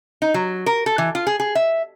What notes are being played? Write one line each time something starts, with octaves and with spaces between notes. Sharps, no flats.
D#4
F#3
A#4
A4
E3
F4
G#4
G#4
E5